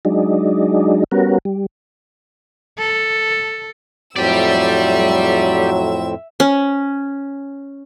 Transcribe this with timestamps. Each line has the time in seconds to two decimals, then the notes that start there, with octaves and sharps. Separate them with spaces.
0.05 F#3 G#3 D4 D#4
1.11 G3 B3 C#4 F#4 A#4
1.45 G3
2.78 A4
4.16 F2 A2 F#3 C4 G4 D5 E5 E6
6.40 C#4